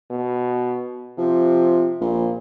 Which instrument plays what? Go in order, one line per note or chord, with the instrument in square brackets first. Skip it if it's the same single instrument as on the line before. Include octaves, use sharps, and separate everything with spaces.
[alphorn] B2
[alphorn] C3 [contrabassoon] F3
[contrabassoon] A#1 [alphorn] A#2